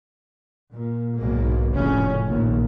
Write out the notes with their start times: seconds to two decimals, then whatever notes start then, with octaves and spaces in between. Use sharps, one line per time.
0.72 A#2
1.17 B1 G#2 A#3
1.71 F1 A2 C#3 C#4
2.28 A#1 D#2